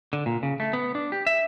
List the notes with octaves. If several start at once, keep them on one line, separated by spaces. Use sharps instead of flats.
D3
A#2
C#3
A3
B3
D4
G4
E5